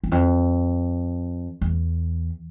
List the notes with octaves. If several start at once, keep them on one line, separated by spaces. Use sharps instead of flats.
E2
F2
E2